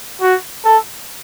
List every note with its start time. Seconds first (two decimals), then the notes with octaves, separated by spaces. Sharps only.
0.22 F#4
0.64 A4